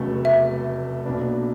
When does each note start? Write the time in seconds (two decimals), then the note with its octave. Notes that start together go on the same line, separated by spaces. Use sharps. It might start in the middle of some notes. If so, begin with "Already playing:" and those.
Already playing: F1 E2 C#3 F#3 A3
0.25 E5
1.06 B1 A#2 F#3 B3 D4